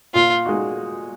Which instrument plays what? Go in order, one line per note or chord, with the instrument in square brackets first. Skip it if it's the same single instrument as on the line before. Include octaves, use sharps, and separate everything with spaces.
[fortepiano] A#2 [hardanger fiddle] F4
[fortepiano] G#3 D#4 F#4